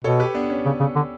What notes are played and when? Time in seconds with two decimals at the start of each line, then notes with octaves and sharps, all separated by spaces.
0.04 B2 A4 C#5
0.20 G4 B4
0.34 B3 D4
0.50 C#4
0.65 C#3
0.80 C#3
0.96 D3